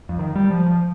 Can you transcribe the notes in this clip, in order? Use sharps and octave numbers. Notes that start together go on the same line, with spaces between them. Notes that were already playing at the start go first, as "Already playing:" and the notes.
F2
D#3
G3
F3
F3